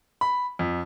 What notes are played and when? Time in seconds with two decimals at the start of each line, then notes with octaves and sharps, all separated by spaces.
0.21 B5
0.59 F2